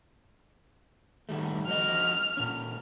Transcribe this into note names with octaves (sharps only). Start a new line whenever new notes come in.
D#3 G3 A3
F3 F#4 D#5 F6
A#2 C#4